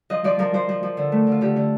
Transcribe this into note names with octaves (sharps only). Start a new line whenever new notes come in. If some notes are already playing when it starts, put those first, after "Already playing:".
F3 D#5
F3 D5
F3 A#4
F3 C5
F3
F3
D3
A3
D3 F4
D3 G4
D3